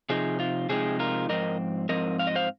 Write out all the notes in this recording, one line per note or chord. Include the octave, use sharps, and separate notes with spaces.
C3 F3 D#4 G#4
F4
C3 F3 G#3 C4 D#4 G#4
F4 A#4
G#2 F3 C4 A#4 D#5
G#2 F3 C4 A#4 D#5
F5
D#5
C5 F5